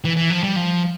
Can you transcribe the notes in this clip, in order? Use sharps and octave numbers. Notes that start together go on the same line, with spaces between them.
E3
E3
F3
G3
F3